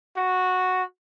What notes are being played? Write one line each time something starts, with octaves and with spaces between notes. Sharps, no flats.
F#4